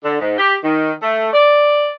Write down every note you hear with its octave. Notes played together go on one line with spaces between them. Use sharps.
D3
G#2
G4
D#3
A3
D5